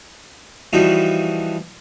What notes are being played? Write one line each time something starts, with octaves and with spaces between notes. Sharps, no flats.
E3 F3 G3 B3 D#4 F#4